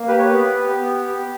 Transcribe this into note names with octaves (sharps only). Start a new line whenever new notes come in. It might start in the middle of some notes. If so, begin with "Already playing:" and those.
Already playing: A#3
G4 B4
C#5
B3 B4
G4
B3
G4